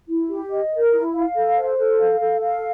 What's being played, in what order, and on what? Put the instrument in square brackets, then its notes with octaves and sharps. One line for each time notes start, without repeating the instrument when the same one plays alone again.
[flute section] E4
G4
D#5
A#4
E4
F5
A4
C5
A4
F5
A4
F5